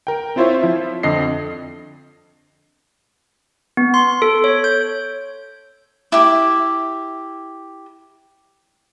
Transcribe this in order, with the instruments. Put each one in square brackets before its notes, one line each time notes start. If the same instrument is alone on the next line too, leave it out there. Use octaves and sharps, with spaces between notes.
[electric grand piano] A#4 G5
C4 E4 F4 C5 C#5 E5
F3 E4 E5
F2 D3 D#5 C7
[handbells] B3
C6
A4
C#5
G6
[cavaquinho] E4 G4